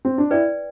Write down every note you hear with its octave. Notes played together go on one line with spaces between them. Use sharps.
C4
D4
E4 B4 D5 G5